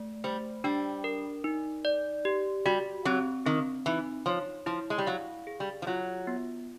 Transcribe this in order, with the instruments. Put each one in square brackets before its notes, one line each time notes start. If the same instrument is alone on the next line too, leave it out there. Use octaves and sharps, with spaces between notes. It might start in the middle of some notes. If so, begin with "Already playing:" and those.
Already playing: [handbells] A3
[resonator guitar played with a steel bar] G3 [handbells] C5
[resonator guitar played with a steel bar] G3 [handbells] D4
[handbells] A#4
D#4
D5
G4
[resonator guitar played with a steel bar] G3 [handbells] F#4
[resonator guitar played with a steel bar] F#3 [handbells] C4
[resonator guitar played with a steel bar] D#3 [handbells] C4
[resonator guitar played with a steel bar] E3 [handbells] D#4
[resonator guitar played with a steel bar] F3 [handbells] C#5
[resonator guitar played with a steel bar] F3 [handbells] E4
[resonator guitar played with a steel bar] G#3
G3
[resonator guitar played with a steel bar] F#3 [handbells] F5
[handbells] G#4
[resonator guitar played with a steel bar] G3
F3
[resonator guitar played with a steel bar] F#3 [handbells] F4
[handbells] B3